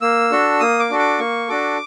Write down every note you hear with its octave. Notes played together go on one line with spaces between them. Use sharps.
A#3 E6
D4 F#4 A4
A#3 D#6
D6
D4 F#4 A4
D6
A#3 C#6
D4 F#4 A4 D6